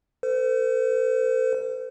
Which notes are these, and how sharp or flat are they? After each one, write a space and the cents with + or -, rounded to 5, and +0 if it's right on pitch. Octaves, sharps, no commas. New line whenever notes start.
A4 +45 C5 -35